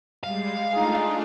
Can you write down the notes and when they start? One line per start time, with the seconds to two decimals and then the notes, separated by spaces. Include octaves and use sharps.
0.23 G3 G#3 F5
0.72 A3 D4 D#4 F4 G#4